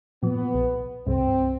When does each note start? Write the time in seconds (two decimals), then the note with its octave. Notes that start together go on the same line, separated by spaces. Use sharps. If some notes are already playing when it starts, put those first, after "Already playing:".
0.23 A#2 F3 B3
0.54 B1
1.07 C2 G2 C4